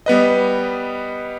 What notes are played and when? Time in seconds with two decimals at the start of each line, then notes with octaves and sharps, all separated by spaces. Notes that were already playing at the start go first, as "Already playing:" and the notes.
0.06 G3 B3 B4 D#5